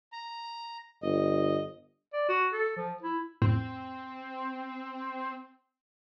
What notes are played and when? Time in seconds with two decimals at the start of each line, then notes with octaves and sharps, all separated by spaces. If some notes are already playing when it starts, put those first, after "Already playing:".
0.12 A#5
1.02 G1 D#5
2.13 D5
2.28 F#4
2.53 A4
2.77 F3
3.03 E4
3.42 F2 A2 C4